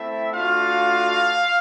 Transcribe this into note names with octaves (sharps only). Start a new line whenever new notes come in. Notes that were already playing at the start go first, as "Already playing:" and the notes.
Already playing: A3 C4 E4 E5
A3 D4 F4 F#4 F5